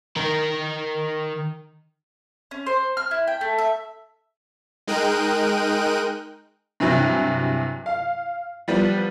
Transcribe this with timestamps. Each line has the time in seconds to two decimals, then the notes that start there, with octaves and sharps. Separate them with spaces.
0.16 D#3 A#4
2.51 C#4
2.66 C5
2.97 F6
3.11 E4
3.27 G5
3.41 A3
3.58 E5
4.87 G#3 D#4 A#4 G5 F#6 D#7
6.80 G2 C3 E3 F#3
7.86 F5
8.68 F3 G3 B3